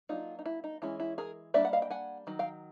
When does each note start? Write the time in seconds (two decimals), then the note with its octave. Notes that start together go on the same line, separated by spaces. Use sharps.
0.09 F#3 A#3 D4 D#4 F4
0.39 D#4
0.46 E4
0.64 D#4
0.82 E3 G#3 C#4 E4
1.00 E4
1.18 G#4 A#4
1.54 G3 A#3 D4 D5 E5
1.65 F#5
1.73 D#5 F5
1.82 G5
1.91 F#5 G#5
2.27 D#3 F#3
2.39 F5 G5